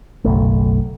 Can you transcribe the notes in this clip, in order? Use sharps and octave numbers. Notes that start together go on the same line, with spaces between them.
F#1 B1 A3